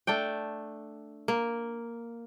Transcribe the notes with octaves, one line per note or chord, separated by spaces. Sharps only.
A3 D4 D5 G5
A#3